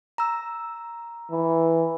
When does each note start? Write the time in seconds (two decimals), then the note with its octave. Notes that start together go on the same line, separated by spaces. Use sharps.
0.18 A#5 E6
1.31 E3